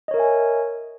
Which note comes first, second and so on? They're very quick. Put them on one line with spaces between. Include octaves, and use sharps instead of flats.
D#5 C#5 A#4 E5 G#5